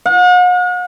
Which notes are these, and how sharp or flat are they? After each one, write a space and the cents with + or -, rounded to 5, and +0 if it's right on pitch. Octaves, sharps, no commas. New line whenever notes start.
F#5 -45